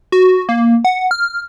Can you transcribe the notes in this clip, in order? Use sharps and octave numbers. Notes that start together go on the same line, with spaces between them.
F#4
A#3
F#5
F6